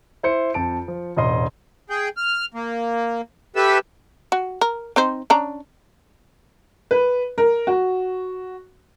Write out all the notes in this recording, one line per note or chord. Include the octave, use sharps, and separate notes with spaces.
E4 C5 C#7
F2 A5 D7
F3
E1 A1 D#5 C6
G#4 G5
F6
A#3
G4 A4 B4 E5 E6
F#4
A#4
C4 D#4 C5
C#4 D4 A#5
B4
A#4
F#4